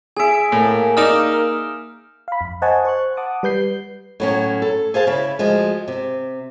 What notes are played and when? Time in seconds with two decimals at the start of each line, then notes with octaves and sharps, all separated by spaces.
0.17 G#4 E5 G#5 D7
0.52 A2 A#3
0.97 D#4 D5 D#6 F6 E7
2.28 F5 B5
2.41 F2
2.62 C5 D#5 F#5 G#5 A5 C#6
2.85 C5 C#6 F#6
3.17 F#5 A5 D6 D#6
3.43 G3 B4 G6 C7
4.20 A2 F#3 C#4
4.62 A4
4.94 G#4 C5 F5 A5
5.07 C#3 E4
5.39 D2 F3 G#3
5.88 C3